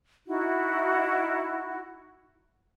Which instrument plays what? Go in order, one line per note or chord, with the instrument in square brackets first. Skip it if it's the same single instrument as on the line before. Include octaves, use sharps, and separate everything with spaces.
[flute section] D#4 E4 F#4